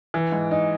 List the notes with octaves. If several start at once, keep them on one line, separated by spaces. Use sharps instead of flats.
E3
G#2
D#4